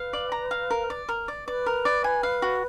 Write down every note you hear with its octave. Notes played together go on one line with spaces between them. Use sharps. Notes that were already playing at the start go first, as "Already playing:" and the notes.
Already playing: B4 F5
D5
A#5
F5
A#4
D5
A#4
D5
B4 D5
A#4
D5
G#5
F5
F#4